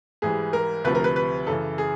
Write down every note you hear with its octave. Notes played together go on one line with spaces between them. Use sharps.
G#2 E3 G3 G#4
A#4
D2 C3 F3 B4
A#4
B4
B4
F#2 C#3 E3 A4
G#4